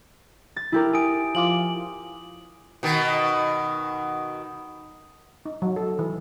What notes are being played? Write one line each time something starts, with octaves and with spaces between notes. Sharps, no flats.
A6
E4 G4 A#4
G#5 D#6 D7
F3 F4 D6 F#7
B2 D#3
D#4
F#3
A4
E3